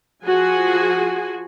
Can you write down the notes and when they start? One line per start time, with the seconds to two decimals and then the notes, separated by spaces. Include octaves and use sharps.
0.24 F3 F#4 G#4 G#5